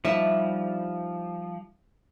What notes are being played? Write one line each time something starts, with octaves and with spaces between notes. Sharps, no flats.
F3 G3 D#4 E4 E5 A5